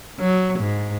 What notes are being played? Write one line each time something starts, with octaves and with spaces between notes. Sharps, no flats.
F#3
G#2